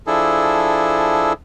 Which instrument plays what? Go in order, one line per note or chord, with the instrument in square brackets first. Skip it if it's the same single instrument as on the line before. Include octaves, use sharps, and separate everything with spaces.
[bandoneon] F3 D4 E4 G#4 A4